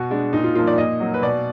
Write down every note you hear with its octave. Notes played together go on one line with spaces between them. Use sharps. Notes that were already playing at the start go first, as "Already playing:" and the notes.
Already playing: B2 F#4
G#3 D4
A#2 D#4
F4
F3 A#3 F4
D5
A#2 D#5
F#3 A#3
B4
B2 D5